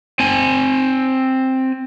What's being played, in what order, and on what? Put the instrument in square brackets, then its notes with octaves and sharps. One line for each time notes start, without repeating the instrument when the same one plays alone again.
[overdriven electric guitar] C4 G#5